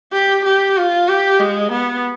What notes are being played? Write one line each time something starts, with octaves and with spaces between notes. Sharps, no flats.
G4
G4
F4
G4
G#3
B3